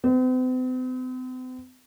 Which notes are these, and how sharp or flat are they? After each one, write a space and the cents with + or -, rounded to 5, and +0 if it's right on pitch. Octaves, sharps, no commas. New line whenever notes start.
C4 -45